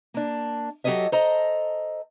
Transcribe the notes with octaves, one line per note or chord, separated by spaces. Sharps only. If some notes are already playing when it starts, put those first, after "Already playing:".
A#3 D4
F#3 G4 A4 C#5 D#5 E5
A4 C5 D#5 A#5